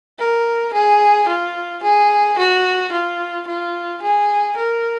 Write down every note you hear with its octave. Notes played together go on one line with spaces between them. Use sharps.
A#4
G#4
F4
G#4
F#4
F4
F4
G#4
A#4